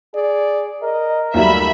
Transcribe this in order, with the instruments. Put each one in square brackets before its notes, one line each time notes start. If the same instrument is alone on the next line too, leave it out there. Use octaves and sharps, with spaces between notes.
[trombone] G#4 [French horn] D5
[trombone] A#4 [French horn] D#5
[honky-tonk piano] D#2 F#3 G3 [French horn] A3 [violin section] E5 B5